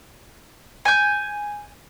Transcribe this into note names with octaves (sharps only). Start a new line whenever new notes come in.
G#5 G6